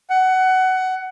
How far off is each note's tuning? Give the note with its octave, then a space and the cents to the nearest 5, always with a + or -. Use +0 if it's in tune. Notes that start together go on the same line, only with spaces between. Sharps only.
F#5 +20